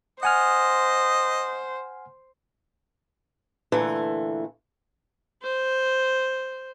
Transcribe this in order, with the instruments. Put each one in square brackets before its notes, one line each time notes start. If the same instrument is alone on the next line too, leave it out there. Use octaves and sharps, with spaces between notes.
[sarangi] C5 [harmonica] D#5 [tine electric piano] F#5 G#5 F6
[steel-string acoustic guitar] A#2 D3 E3 A3
[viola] C5